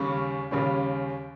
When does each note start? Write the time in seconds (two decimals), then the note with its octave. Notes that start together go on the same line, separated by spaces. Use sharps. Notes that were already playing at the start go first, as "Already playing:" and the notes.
Already playing: D#2 C#3 G3 C#4 C#6
0.51 D#2 C#3 G3 C#4